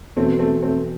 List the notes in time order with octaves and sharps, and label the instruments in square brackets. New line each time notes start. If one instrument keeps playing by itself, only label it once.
[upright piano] E2 B2 F#3 B3 [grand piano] A3 C4
[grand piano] A3 C4
A3 C4